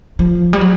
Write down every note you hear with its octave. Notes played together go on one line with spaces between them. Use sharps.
F3
G3
F#3